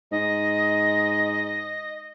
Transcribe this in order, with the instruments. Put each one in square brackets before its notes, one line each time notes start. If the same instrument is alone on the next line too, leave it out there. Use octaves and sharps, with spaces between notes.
[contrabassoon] G#2 [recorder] D#5